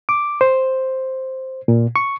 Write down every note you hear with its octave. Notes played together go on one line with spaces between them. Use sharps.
D6
C5
A#2
C#6